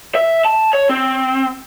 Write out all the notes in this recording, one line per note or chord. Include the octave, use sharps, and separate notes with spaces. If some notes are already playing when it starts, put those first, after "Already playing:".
E5
A5
C#5
C4